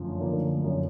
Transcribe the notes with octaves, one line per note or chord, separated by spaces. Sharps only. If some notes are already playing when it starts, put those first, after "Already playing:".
Already playing: F#2 D3 F3
D3 F3 A#3
F#2